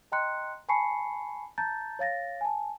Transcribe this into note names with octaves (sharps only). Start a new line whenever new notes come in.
D#5 G5 A#5 C6 F#6 C#7
G#5 A5 B5 C#6 C7 C#7
A5 A#5 G6 A6
C#5 F5 A6 A#6
G#5 A5